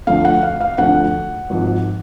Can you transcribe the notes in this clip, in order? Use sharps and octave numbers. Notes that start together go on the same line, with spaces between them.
D2 D3 F3 F5
F#5
F5
F5
D2 D3 F3 F#5
G#1 G#2 F3